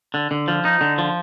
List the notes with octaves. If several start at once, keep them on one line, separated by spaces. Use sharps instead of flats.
D3
D3
F3
D#4
D3
F3